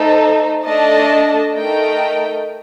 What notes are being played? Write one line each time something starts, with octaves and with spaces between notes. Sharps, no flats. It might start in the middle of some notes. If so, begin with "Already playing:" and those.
Already playing: A3 D#4 A4 C5
A3 D4 A4 D#5 A5
A3 D#4 A#4 D#5 G5